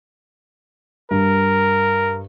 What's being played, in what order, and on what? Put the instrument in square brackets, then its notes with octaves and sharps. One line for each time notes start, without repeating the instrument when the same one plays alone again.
[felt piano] G2 [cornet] A#4